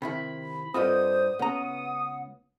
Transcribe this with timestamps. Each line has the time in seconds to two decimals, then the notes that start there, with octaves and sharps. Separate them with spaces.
0.02 C3 D#3 E4 B5
0.74 G2 C4 F4 A4 C5 D#5 F#5 D#6
1.39 C#2 B3 C#4 F#5 A#5